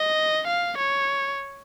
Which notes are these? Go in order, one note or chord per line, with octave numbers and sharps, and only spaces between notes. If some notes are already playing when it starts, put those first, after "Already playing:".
Already playing: D#5
F5
C#5